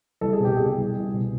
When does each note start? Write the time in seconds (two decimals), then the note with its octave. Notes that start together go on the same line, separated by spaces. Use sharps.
0.21 C2 A4
0.33 G#4
0.40 B2 G4
0.57 B2 G#4
0.78 C2
0.96 C2
1.14 B2